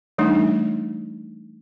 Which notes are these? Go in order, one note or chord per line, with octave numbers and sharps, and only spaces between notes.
E3 G3 A3 D4 D#4